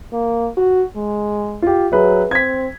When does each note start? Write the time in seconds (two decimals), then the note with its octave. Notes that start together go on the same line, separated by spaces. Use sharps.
0.13 A#3
0.57 F#4
0.96 G#3
1.62 F4 G4
1.92 F#3 G#4 B4 E5
2.31 C4 G#6 B6